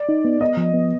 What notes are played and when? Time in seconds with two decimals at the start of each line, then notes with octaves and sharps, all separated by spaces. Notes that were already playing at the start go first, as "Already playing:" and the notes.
Already playing: D5
0.09 D#4
0.25 B3
0.41 B3 D#5
0.57 F3
0.74 B3